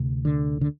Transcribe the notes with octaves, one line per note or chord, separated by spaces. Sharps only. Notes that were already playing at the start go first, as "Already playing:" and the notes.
Already playing: D2 C3
D3
D3